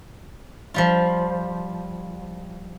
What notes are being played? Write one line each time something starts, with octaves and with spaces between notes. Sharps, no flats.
F3 G3 F4